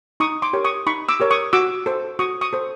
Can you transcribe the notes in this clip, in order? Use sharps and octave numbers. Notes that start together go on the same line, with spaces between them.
D#4 C#6 D#6
C6 D6
G4 A#4 C#5
C#6 D#6
D#4 B5 C#6
D6 E6
G4 A#4 C#5
C#6 D#6
F#4 D6 E6
A4 C5
F#4 C#6 D#6
C#6 D#6
A4 C5